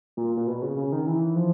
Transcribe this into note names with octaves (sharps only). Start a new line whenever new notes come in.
A#2
A#2
B2
C#3
C#3
D#3
E3
F3